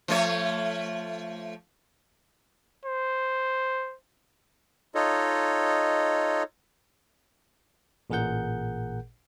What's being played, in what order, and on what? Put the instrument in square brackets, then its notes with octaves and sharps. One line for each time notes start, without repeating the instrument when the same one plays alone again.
[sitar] F3 A3 C#5
[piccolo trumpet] C5
[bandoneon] D#4 F4 A4 C#5 D#5
[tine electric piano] A1 A#2 G#4 A#4 F#5 G6